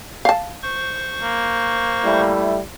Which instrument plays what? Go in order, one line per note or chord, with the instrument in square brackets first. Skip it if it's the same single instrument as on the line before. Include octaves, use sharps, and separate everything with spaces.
[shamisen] F5 A5
[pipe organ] C5 C#6
[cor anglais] A#3
[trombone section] G3 A3 E4